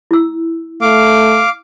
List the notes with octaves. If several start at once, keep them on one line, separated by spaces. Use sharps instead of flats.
E4 E6
A3 F5 D6